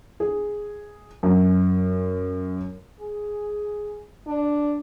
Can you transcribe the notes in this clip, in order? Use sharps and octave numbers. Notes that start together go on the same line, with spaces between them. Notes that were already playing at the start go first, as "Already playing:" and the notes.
G#4
F#2
G#4
D4